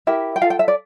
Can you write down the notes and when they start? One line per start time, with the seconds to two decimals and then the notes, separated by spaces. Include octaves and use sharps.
0.07 E4 G4 A#4 E5
0.36 G5
0.42 F4 A4 F5
0.50 G5
0.59 E5
0.68 D5